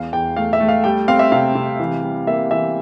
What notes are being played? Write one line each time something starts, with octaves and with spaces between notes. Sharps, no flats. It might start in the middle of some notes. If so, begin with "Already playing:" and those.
Already playing: E2 F5
E2 G5
A3 F5
E5
A3
F5
G3 G5
C4 F5
E5
C3 F5
C3
E3
G3
A#3 E5
E3 E5